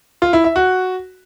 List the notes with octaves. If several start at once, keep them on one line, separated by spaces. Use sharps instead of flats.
F4
E4
E5
F#4